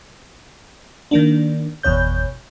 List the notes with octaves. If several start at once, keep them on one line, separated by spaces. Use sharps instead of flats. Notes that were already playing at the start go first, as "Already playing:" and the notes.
D#3 A#3 D4
G1 E2 B2 C#5 G6